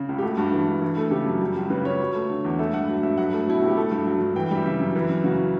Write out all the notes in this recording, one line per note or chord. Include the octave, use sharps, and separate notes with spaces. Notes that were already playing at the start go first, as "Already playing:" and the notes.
Already playing: C#3
C#2
G4
A3 F#4
G2 F#4
E3
G2
E3
A3 A4
C#3 G4
F#2
G3
C#2
C#3 B4
C#2 C#5
F#3
A3
D3
E2
A3 E5
G2 F#5
F#3 F#5
G2 E5
F#3 F#5
A3
B2 E4
C#2 F#4
G4
A3 A4
G2
F#3
G2
E3 G5
G5
G3 E5
C#3 E5
F#2
E3
F#2
C#3 F#4